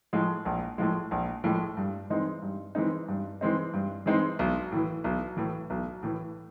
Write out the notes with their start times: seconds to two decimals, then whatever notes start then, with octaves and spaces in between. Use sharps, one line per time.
0.13 A2 F3 G#3
0.45 A#1
0.78 A2 F3 G#3
1.11 A#1
1.44 A2 F3 G#3
1.77 G2
2.10 E3 G#3 C4 D#4
2.42 G2
2.75 E3 G#3 C4 D#4
3.08 G2
3.41 E3 G#3 C4 D#4
3.74 G2
4.06 E3 G#3 C4 D#4
4.39 B1
4.72 A2 E3
5.04 B1
5.37 A2 E3
5.70 B1
6.03 A2 E3